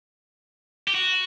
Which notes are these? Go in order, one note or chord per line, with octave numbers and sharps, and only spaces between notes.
G4
F#4